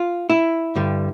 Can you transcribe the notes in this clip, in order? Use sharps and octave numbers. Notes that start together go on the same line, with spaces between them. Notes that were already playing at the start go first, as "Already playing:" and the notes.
Already playing: F4
E4
G2 D3 G3